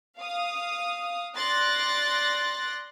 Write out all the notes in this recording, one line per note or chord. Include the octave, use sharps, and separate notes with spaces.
F5 D#6
D5 C6 F#6 A6 A#6